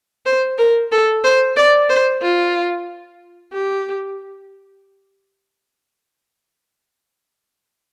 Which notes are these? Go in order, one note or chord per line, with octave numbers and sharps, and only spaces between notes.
C5
A#4
A4
C5
D5
C5
F4
G4